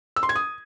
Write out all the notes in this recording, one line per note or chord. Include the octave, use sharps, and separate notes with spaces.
E6
C6
G#6
D#6